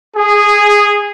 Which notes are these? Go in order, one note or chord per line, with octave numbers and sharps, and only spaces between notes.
G#4